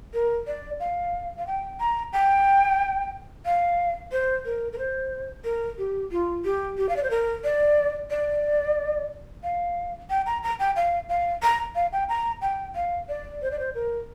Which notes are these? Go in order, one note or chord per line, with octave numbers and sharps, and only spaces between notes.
A#4
D5
F5
F5
G5
A#5
G5
F5
C5
A#4
A#4
C5
A#4
G4
F4
G4
G4
F5
D5
C5
A#4
D5
D5
F5
G5
A#5
A#5
G5
F5
F5
A#5
F5
G5
A#5
G5
F5
D5
C5
D5
C5
A#4